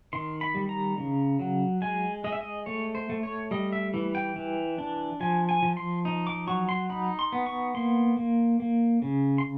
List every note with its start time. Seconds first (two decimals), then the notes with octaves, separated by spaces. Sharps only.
0.13 D#3 C6
0.41 B5
0.55 G3
0.69 A#5
0.98 C#3
1.39 F#3
1.82 G#3 G#5
2.24 G#3 D#5
2.32 E5
2.41 D#5
2.66 A3 C#5
2.95 C5
3.10 A3
3.23 C#5
3.51 G3 D#5
3.73 E5
3.94 E3
4.15 G5
4.36 E3
4.78 D4
5.20 F3 G#5
5.49 G#5
5.63 F3
5.77 C6
6.05 D#4
6.27 D6
6.47 F#3 C#6
6.69 C6
6.89 D#4 B5
7.19 C6
7.32 B3
7.46 C#6
7.74 A#3 C6
8.17 A#3
8.60 A#3
9.02 C#3
9.38 C6